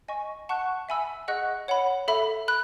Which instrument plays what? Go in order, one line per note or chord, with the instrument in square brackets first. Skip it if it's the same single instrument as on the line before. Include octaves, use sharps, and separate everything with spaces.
[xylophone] D#5 G#5 C#6
F#5 A5 C#6 F#6
E5 G#5 B5 E6
G#4 D#5 F#5 C#6 F#6
C#5 F#5 B5
A4 E5 B5
B5 F#6